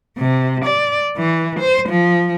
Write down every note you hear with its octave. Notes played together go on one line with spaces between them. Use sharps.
C3
D5
E3
C5
F3